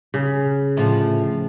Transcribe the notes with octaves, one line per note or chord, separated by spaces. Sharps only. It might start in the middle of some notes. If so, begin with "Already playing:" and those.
C#3
A2 D3 F3